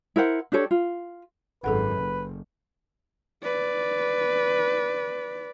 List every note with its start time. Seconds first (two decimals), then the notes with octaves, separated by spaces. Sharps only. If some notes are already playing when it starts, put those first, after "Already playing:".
0.16 E4 A#4 C5 F#5
0.52 D4 G4 A4 C#5
0.71 F4
1.64 G#1 F#2 G#4 A4 B4 F#5
1.97 F#1
3.44 B4 D5